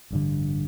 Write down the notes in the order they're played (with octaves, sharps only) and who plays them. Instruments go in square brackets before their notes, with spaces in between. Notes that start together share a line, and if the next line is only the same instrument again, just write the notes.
[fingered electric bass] A1 G2 D3